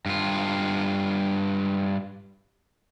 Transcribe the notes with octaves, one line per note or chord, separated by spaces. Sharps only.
G2 F4